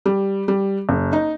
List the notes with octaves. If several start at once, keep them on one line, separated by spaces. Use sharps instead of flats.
G3
G3
F#1
D#4